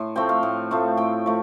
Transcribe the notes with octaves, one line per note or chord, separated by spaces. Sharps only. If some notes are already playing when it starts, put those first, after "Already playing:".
Already playing: A2 C6
F3 A3 C4 G5
F5
A2
F3 A3 C4
A2 G5
F3 A3